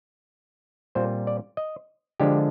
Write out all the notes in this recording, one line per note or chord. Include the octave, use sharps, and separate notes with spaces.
A#2 G3 C4 F4 C5
D5
D#5
D3 F3 G#3 D4 G4